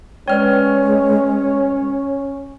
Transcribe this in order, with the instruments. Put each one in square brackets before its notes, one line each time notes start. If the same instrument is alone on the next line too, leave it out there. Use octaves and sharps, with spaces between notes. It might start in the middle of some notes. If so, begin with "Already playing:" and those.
[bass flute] G#3 [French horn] C#4 [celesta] B4 D5 G5 [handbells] C#5 F6